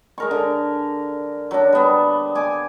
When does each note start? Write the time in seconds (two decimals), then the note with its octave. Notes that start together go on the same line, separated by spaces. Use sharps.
0.18 G#3 A#4 C#6
0.31 D3
1.51 F#3 D4
1.73 G3 B3
2.35 G#5 D6